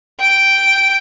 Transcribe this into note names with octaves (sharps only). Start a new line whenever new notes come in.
G5